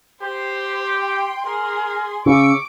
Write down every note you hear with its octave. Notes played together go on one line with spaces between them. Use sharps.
G4 C5 C6
G5
G#4 A#4
C#3 C#6 D6 E6